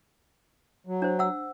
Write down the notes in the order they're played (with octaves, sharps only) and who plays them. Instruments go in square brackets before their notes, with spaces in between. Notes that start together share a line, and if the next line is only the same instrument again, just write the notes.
[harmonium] F#3
[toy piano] D4 C5
F#5 E6